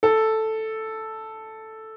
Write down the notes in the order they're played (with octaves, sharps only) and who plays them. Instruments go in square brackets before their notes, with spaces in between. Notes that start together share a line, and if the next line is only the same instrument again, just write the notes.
[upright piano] A4